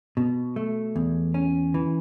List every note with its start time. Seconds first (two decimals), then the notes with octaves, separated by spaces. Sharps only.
0.17 B2
0.56 A3
0.96 E2
1.34 C#4
1.74 E3